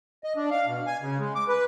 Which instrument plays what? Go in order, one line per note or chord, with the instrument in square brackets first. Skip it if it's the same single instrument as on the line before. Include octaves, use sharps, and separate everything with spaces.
[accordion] D#5
D4
F5
B2
G#5
C#3
G#3
D6
B4